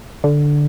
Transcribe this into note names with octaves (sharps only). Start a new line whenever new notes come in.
D3